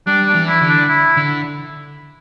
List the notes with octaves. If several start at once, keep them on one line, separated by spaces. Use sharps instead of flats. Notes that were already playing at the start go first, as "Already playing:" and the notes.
G3 D4
D4
E3
E4
D3
D4
E4
D3